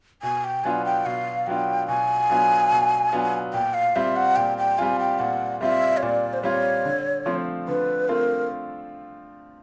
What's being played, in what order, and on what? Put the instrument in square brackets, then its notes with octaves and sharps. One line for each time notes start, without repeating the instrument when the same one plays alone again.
[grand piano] B2 [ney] G#5
[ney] G5
[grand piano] F#3 B3 D4 F4 [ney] G#5
[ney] G5
[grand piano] B2 [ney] F5
[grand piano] F#3 B3 D4 F4 [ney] G5
[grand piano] B2 [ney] G#5
[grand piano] F#3 B3 D4 F4
B2
F#3 B3 D4 F4
[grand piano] A#2 [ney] G5
[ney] F5
[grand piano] G3 C4 F4 [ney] E5
[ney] F#5
[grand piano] A#2 [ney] G5
[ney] G5
[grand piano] G3 C4 F4 [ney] G#5
[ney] G5
[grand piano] A#2 [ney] F#5
[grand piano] G3 C4 F4 [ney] E5
[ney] C#5
[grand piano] A#2 [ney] D5
[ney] C5
[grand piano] G3 C4 F4 [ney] C#5
[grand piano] D3
F3 A3 C4 F4
[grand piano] D3 [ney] B4
[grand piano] A3 C4 F4 [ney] A#4